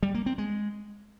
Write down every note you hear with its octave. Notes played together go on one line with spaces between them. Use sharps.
G3
A#3
C4
G#3